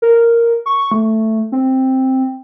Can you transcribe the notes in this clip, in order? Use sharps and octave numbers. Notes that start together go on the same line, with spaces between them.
A#4
C#6
A3
C4